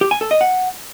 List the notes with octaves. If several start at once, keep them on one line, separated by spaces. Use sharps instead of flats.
G4
G#5
A4
D#5
F#5